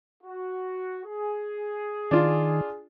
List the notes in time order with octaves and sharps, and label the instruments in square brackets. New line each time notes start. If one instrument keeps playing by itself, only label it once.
[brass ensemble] F#4
G#4
[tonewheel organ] D#3 [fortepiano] D4 F4